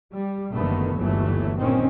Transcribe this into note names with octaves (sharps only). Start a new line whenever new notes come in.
G3
F#1 B2 D3 D#3 A3 B3
G1 D#2 E3 F#3 A3
G2 A#2 D#3 C4 C#4